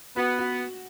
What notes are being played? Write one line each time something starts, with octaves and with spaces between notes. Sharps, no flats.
B3 F#4
F#4